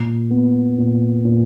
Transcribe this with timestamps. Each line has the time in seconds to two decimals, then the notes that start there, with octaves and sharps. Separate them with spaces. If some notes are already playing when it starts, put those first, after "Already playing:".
Already playing: A#2
0.30 B3
0.78 A#2
1.25 A#2